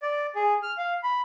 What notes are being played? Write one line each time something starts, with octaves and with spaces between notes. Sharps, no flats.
D5
G#4
F6
F5
B5